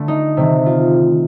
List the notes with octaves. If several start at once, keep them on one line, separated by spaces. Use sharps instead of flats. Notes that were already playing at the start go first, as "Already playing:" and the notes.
Already playing: D3 A3
D#4
C3 D#3 A3
F4